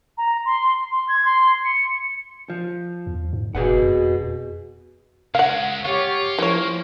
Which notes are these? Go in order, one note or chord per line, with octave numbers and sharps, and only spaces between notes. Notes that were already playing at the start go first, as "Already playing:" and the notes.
A#5
C6
C6
G#6
C6
C#7
F3
E2
G#2
F1 B2 G#4 B4 F#5
F2
C#2 G#3 F5 F#5
F4 G4 C#5 F#5
E3 F3 A#3 C#5